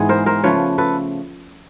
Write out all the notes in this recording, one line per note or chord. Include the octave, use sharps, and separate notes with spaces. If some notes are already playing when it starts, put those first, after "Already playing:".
Already playing: G#2 E3 G#3 B3 G#4
A#4 C5
A#4 C5
C#3 F3 A3 B4 C#5
A4 B4